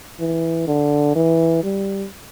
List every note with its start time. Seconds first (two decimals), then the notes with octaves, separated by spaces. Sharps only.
0.20 E3
0.68 D3
1.15 E3
1.63 G3